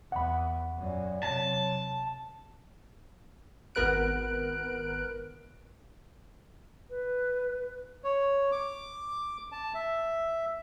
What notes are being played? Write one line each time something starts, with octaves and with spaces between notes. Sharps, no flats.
E2 F#5 B5
F#2 A#2
C3 F#3 A5
G#1 B3 A#4 B4 F#6 D7
B4
C#5
D6
A5
E5